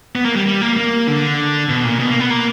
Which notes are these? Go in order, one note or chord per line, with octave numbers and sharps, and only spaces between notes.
B3
A#3
G3
G3
A#3
A#3
D3
B2
A#2
B2
A#3
B3
A#3